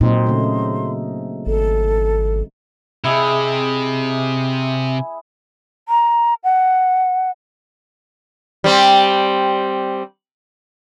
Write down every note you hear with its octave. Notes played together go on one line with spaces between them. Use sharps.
A#2 F#3 C4 D#4 C6
C#3 A3
G#1 A4
C3 E4 G#4 D#5
A#5
F#5
G3 C4